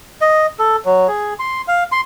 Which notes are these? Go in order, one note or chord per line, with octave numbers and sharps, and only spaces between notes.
D#5
A4
F#3
G#4
C6
F5
C6